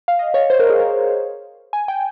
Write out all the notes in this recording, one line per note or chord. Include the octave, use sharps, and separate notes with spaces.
F5
D#5
C#5
C5
A#4
G#4
A#4
G#5
G5